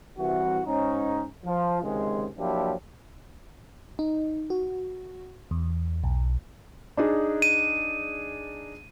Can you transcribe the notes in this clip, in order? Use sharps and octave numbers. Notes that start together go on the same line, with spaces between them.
C2 E3 F#4
G#2 C#4 D#4
F3
C#2 C3 D#3 G#3
F3 F#3 A#3 D4 E4 G4
D#4
F#4
E2
B1
D4 D#4 G#4
D#7